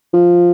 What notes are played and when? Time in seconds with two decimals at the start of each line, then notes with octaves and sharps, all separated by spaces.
0.13 F3